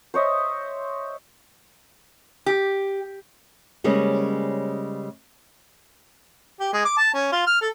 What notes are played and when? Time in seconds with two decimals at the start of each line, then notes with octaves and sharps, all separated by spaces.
0.14 C5 C#5 D#5 E5
2.46 G4
3.84 C#3 G3 G#3 A#3 C4 C#4
6.60 G4
6.73 G#3
6.85 D6
6.97 A5
7.14 C#4
7.32 F4
7.47 F6
7.61 A4